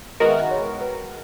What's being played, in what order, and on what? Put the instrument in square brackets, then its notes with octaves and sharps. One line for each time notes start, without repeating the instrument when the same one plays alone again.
[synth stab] D#3 G#3 B3 F#4 A#4 [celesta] D#5
[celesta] E5
D#5
C#5
B4